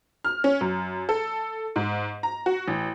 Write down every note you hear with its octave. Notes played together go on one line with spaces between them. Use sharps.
F6
C#4
F#2
A4
G#2
A#5
F#4
A1